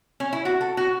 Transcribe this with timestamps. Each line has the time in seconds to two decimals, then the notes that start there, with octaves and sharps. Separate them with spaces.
0.20 C#4
0.33 E4
0.45 F#4
0.61 A4
0.77 F#4